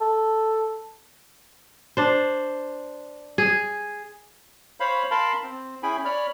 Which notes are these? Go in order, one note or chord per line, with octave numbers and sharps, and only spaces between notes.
A4
D4 C5
G#4
C5 C#5 F5 B5
A#4 F5 A5 B5 C6
C4
C#4 E4 G#4 G5 G#5 B5
C#5 D5 B5 F6